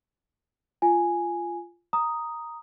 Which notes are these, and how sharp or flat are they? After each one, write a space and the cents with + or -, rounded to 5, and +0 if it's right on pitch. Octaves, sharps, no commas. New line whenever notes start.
F4 -15 G#5 +0
A#5 +0 D#6 +0